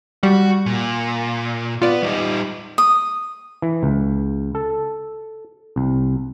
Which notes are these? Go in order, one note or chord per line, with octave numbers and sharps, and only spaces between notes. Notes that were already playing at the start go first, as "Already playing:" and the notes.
G3 F#4
A#2
B3 F4 D5
G3 D#4
D#6
E3
C#2
A4
C2